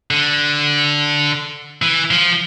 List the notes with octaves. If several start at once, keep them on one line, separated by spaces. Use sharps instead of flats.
D3
E3
F3